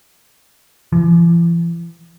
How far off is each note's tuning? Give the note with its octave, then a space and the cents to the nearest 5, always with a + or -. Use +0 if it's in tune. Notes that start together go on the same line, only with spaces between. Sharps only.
E3 +45